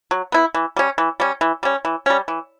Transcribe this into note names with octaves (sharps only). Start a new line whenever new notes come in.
F#3
B3 E4
E3
G3 C#4
E3
G3 C#4
E3
G3 C#4
E3
G3 C#4
E3